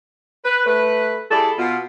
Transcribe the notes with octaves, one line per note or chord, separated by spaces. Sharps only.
B4
A3 B4
G3 E4 G#4 A4 D5
B2 F4